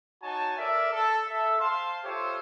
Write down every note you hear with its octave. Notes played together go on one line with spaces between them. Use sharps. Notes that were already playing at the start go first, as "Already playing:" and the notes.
D#4 F#4 C#5 G#5 A5
A4 A#4 D5 E5
A4
A4 E5
C5 F5 A5 C6
F4 G4 A4 C5 C#5 E5